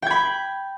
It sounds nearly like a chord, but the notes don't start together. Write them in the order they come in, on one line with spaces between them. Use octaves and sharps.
G5 G#6 B5